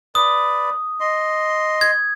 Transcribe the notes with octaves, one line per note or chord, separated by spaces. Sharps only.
B4 D5 D#6
D#5 C6
G#6